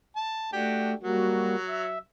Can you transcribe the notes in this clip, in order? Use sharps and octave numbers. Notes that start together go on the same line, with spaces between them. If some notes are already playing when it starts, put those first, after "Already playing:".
A5
A3 D4 F#4 G4
F#3 G3 A#3 F#4
E5